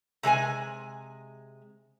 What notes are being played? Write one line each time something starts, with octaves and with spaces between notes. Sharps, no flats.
C3 G#3 C5 G#5